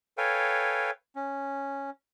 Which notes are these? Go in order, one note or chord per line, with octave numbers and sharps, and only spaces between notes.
A4 B4 C#5 F5 G5 G#5
C#4